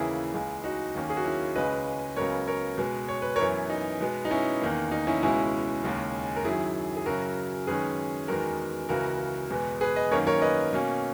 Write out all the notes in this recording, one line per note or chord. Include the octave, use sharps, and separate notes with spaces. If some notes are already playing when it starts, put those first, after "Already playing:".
Already playing: D#2 C#3 E3 A#3 C#4 E4 G#4
C#2 C#3 G#3
D#4 F#4
D#2 D#3 A#3 C#4
G#4
F#4
C#4 E4
C#2 C#3 G#3 C#4 B4 D#5
C#2 C#3 F#3 B3 A#4 C#5
A#4 C#5
B2 G#3 B3
C#5
B4
F#2 E3 B3 A#4 C#5
D#4
B2 G#3 B3
D#4
C#4 E4
E2 D#3 A#3
D#4
C#4 E4
C#2 B2 G#3 C#4 E4
D#2 C#3 G#3 C#4
A#4
F#2 D#3 F#3 E4 G#4
G#4
F#2 C#3 F#3 C#4 F#4 A#4
F#2 D#3 G#3 C#4 G#4 B4
E2 D#3 G#3 B3 F#4 A#4
C#2 C#3 E3 F#4 A#4
E2 B2 G#3 B3
G#4 B4
B4 D#5
F#2 D#3 A#3 C#4 A#4 C#5
A#4 C#5
B4 D#5
B2 A#3 C#4